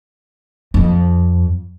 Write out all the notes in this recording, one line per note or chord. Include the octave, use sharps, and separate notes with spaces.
F2